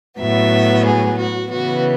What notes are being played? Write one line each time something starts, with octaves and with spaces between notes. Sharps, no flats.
A2 F#3 B3 E5
G#4
F#4
C#3 E3 B3 F#4